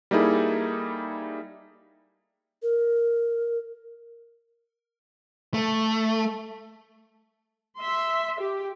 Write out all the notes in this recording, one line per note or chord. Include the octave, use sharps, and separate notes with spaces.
G3 A#3 D#4 E4 G#4 A4
A#4
A3
E5 C6
G4